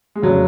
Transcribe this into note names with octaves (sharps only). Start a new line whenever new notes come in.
G#3
F1 C#3 F#3